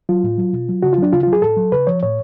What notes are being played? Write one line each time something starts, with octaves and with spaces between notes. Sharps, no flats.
F#3 F4
A2
F#3
B2
F#3
C#3 F#4
F4
F#3 D4
C#3 F4
F#3 F4
G#4
A2 A4
F#3
C#3 B4
F3 C#5
A2 C#5